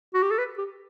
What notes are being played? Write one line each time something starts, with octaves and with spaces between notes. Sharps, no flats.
F#4
G4
A4
B4
G4